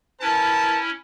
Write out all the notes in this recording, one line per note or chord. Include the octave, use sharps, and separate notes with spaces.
C#4 E4 A#4 B4 A5